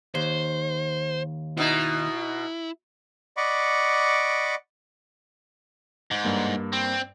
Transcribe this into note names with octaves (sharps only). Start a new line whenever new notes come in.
D#2 C5
B2 D#4 E4
D5 D#5 F#5 B5 C#6 D6
G#2
G2 G3 A#3
C4